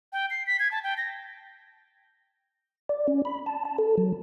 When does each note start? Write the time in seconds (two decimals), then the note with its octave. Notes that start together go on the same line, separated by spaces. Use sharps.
0.13 G5
0.30 C7
0.47 B6
0.60 G#6
0.71 A5
0.84 G5
0.98 A#6
2.89 D5
3.08 C#4
3.25 B5
3.46 A5
3.65 A5
3.78 A4
3.98 F#3